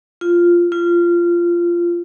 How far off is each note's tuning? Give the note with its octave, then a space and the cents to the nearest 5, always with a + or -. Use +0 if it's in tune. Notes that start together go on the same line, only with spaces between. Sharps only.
F4 -5
F4 -15